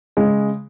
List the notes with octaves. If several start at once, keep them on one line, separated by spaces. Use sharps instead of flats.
C#3 G#3